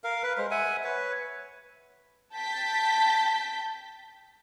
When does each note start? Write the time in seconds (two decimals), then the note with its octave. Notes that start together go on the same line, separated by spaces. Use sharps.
0.04 A#4 F5
0.23 B4
0.38 G#3 C5
0.51 E5 F#5 G#5
0.84 B4 C#5
2.34 G5 A5 G6 A6 B6